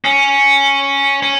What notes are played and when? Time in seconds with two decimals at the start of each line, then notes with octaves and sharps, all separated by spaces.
0.05 C#4
1.23 C#4